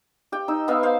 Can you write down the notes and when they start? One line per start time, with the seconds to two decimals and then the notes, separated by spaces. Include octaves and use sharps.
0.32 G4 G5
0.48 D#4 E6
0.68 B3 D#4 E5 F5
0.83 C5 F5